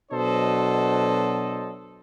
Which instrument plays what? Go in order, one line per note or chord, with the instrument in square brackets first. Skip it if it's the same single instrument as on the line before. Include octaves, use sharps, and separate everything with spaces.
[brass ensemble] B2 F#3 D4 A4 C5 D#5